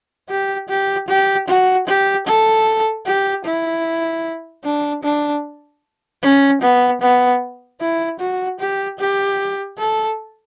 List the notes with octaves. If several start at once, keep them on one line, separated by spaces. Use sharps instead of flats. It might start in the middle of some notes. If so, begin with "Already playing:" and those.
G4
G4
G4
F#4
G4
A4
G4
E4
D4
D4
C#4
B3
B3
E4
F#4
G4
G4
A4